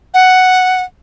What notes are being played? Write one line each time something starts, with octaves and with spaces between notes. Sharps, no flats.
F#5